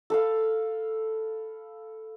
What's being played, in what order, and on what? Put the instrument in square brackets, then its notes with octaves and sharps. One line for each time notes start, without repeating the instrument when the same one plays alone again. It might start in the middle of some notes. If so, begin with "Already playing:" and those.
[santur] A4 B4 F5